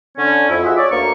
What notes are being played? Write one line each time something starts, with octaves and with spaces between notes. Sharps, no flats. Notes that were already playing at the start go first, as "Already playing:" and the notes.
D3 C#4
F2 E4
F4 F#4 G#4 D#5 E5
C#5 D5
D2 A#3 C#6